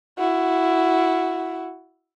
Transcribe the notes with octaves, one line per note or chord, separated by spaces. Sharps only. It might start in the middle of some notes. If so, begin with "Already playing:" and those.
E4 F#4